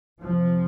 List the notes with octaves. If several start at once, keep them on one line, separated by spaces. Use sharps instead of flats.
F2 C3 F3